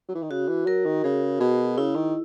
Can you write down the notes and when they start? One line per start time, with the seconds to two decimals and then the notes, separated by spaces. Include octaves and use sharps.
0.09 F#3
0.15 E3
0.22 D#3
0.30 C#3 F#4
0.48 E3
0.66 F#3 A#4
0.86 D#3
1.04 C#3 G#4
1.40 B2 G#4
1.77 C#3 E4
1.96 D#3